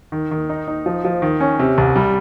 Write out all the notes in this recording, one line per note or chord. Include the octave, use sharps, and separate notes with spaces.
D#3
D#3
D#4
D#4
F3
F3
D#3
C#4
C3
C2
G3